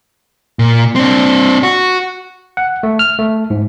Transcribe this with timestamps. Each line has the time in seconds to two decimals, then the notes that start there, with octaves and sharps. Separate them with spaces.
0.59 A#2
0.95 C4 D4
1.63 F#4
2.57 F#5
2.83 A3
2.99 F6
3.19 A3
3.50 G#2